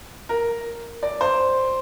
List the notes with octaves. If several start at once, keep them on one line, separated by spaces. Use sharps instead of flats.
A#4
D5
C5